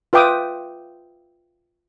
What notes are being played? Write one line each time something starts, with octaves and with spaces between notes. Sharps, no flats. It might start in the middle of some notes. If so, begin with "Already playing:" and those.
F4 B4 E5 G5 D6 D#6